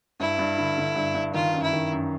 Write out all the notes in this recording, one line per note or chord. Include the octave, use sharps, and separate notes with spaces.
G2 E4
G2
D3
D3
G2
G2
D#3 F4
F#2
E4
D#3
F#2